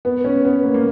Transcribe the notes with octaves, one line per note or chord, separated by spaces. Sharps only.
B3
C#4
B3
A#3
A#3